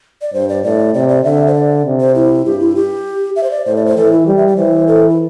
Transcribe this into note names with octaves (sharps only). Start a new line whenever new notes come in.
D5
G2 C5
D5
A2 D5
C3 D5
D5
D3 E5
C5
D5
C3
C5
E4
G2 G4
E4
G4
E5
C5
D5
A2 C5
D5
C5
E3 A4
E4
G3 G4
E5
D5
E3 C5
A4
E4